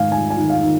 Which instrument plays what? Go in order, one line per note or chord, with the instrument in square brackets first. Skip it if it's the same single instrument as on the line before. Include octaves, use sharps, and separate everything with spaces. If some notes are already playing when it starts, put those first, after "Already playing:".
Already playing: [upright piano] G#2 D#3 F5 G#5
D#3 G#5
G#5
D#3
F5
D#3